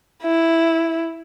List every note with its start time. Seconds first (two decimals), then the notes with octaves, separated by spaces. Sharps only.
0.23 E4